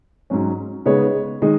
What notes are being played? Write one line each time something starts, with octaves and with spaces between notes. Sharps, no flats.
G#2 F#3 C#4
C#3 G#3 B3 D#4 C#5
D#3 G#3 D#4